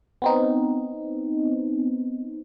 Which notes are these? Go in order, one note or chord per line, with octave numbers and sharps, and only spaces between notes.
B3 C4 D#4